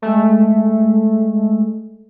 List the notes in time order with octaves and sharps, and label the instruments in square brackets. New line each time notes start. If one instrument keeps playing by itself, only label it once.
[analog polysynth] G#3 A3